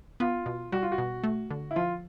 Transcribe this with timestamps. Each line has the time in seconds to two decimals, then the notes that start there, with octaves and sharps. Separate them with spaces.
0.20 B3 F4
0.46 B2
0.72 G3 F#4
0.83 F4
0.92 F#4
0.98 B2
1.24 A3
1.51 D3
1.71 E4
1.76 F3 F4